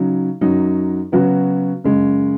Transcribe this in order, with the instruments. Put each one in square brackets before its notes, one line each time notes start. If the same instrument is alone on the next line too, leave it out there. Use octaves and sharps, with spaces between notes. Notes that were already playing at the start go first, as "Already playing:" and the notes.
Already playing: [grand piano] C#3 F#3 D#4
F#2 F#3 D#4
C#3 F#3 B3 F#4
F#2 C#3 G#3